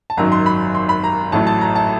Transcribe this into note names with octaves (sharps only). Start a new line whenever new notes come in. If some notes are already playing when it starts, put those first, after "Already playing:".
A5
G#1 F#2 D#3 F#3 A#5
C6
B5
C6
B5
A#5
A1 A2 F#3 A3 A5
A5
A#5
A5